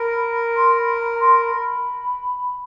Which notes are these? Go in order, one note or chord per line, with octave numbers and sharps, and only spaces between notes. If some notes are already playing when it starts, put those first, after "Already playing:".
Already playing: A#4 B5
C6
B5
A#5
C6
B5